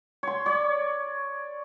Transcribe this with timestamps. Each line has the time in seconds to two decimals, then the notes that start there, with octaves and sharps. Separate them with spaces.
0.23 C#5 C6
0.46 C#5 D5